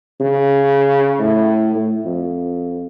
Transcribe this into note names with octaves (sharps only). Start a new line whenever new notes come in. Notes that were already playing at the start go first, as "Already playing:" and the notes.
C#3
A2
A2
F2